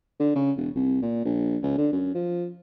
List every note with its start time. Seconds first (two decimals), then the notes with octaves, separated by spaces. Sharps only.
0.19 D3
0.35 C#3
0.57 E1
0.75 C2
1.02 A#2
1.25 A#1
1.63 C#2
1.78 D3
1.92 F#2
2.14 F3